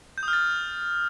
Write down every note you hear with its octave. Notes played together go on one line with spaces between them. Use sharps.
G6
D#6
F6
A6